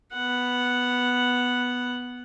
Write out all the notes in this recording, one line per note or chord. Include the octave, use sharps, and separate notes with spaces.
B3 F#5